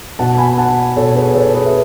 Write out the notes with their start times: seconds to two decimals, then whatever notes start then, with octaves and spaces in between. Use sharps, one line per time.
0.19 B2 F#5 A5
0.38 G#5 B5
0.58 F#5 A5
0.96 B2 A4 C#5
1.15 G#4 B4
1.35 A4 C#5
1.54 G#4 B4
1.65 E5